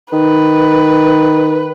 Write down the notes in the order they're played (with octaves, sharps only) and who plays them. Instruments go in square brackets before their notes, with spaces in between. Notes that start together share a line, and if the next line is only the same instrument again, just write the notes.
[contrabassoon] D#3 [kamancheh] B4